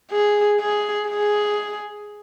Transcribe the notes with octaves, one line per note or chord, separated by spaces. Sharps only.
G#4
G#4
G#4